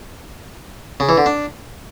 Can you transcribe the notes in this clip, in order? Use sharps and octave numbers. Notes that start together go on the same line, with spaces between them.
C#3
E3
D3
D4